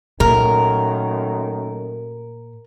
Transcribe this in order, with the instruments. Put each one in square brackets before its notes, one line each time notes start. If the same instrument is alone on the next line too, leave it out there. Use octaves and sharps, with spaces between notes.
[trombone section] F#2 D#3 A3 [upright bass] A#2 [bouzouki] A#4